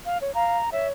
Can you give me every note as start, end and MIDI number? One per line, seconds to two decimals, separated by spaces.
0.06 0.18 77
0.21 0.33 73
0.35 0.57 77
0.35 0.70 82
0.72 0.90 73
0.72 0.87 76